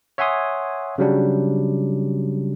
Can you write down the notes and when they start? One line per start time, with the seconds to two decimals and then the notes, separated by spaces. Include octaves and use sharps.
0.18 C#5 E5 F#5 G#5 C6 D#6
0.98 C#3 F#3 G3 D4